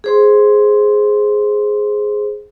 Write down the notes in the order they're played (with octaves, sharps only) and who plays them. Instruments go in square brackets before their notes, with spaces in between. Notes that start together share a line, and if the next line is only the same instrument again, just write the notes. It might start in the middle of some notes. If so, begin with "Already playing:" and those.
[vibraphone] G#4 C5 C6